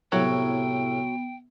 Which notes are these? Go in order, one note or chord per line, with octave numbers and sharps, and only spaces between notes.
C2 A2 F#3 B3 G5